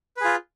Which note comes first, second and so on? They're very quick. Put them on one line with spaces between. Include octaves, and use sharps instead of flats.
B4 G#4 F4